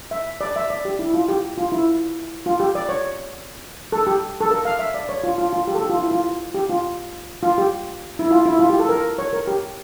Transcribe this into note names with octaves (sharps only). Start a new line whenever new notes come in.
E5
D5
E5
D5
G4
E4
F4
G4
F4
E4
F4
G4
D5
C#5
A4
G4
A4
A#4
F5
E5
D5
C#5
F4
F4
F4
G4
A4
G4
F4
E4
F4
G4
F4
F4
G4
E4
F4
E4
F4
G4
A4
A#4
C#5
A#4
G4